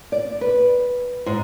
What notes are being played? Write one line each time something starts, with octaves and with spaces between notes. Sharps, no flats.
D5
B4
G#2